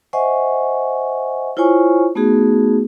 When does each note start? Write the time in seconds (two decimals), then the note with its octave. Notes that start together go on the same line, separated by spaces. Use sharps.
0.13 C5 D#5 E5 F#5 G#5 C#6
1.57 E4 F4 C5 C#5 G#5 C#6
2.15 A3 B3 D#4 F#4 G#4